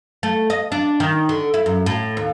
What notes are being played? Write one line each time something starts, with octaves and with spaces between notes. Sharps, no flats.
A3
D#5
D4
D#3
D3
E4
F#2
A2
D#2